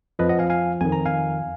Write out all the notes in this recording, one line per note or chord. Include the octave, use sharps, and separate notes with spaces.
F2 F3 B4 D#5
D#5 F#5
F5 G#5
F5 G#5
F2 D#3 G#5
A#5
F5 G#5